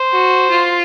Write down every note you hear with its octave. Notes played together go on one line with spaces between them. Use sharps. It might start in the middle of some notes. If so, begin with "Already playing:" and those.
Already playing: C5
F#4
F4